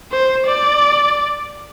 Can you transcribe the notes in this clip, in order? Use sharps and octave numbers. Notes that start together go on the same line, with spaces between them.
C5
D5